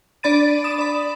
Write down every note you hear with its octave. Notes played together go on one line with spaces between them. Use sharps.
D4 D5 B5 A6 D#7
D#6 E7
D5 B5